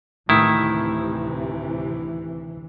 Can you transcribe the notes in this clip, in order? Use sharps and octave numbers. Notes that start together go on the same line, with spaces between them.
D2 A2 C3 D#3 E3 E4